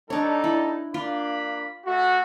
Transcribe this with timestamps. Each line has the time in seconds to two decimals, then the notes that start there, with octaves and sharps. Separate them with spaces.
0.10 G3 D4 D#4 A4 C#5
0.44 E4
0.94 A#3 D4 F4 B5
1.86 A3 F#4